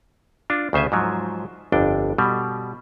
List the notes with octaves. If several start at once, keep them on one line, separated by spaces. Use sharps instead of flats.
D4 F4
D2 C#3 C5 E5 G#5
G#2 F3 F#3
G1 F2 D4 G5
B2 G3